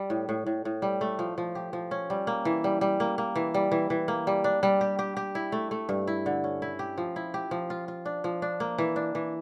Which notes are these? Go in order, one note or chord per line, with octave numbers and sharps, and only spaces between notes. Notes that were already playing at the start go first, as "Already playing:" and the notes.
Already playing: G3
A2
A2
A2
A2
G3
A3
F3
F3
G4
F3
C#4
G3
A#3
E3
G3
G3
A#3
A#3
E3
G3
E3
E3
A#3
G3
D4
G3
G4
G4
G4
E4
A3
A3
G2
E4
D3
C#4
E4
G4
F3
E4
G4
F3
F4
F4
D4
F3
D4
A#3
E3
D4
E3